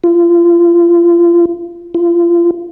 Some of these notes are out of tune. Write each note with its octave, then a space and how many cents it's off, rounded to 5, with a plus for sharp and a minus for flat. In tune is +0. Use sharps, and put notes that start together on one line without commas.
F4 -30
F4 -30